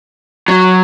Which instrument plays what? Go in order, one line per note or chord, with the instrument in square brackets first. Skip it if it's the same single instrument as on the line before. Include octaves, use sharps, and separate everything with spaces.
[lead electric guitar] F#3